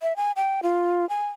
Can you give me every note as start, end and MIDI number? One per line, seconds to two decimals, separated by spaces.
0.02 0.16 76
0.16 0.32 80
0.36 0.61 79
0.63 1.08 65
1.09 1.27 80